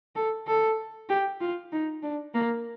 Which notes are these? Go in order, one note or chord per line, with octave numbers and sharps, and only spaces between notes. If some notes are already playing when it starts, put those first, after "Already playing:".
A4
A4
G4
F4
D#4
D4
A#3